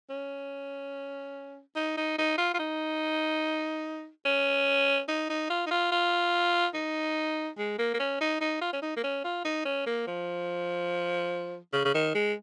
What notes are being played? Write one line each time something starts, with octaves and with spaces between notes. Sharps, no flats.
C#4
D#4
D#4
D#4
F4
F4
D#4
C#4
D#4
D#4
F4
D#4
F4
F4
D#4
G#3
A#3
A#3
C#4
D#4
D#4
F4
C#4
D#4
A#3
C#4
F4
D#4
C#4
A#3
F3
C#3
C#3
D#3
G#3